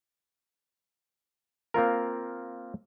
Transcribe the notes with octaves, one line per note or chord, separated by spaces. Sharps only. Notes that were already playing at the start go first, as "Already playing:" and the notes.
A#3 C4 F4 A#4